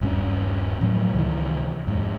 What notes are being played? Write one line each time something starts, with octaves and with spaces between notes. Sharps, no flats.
D#1 G2 C#4
A2 F3 F#3 A3
C#2 C3 D#3 E3
F2 G#2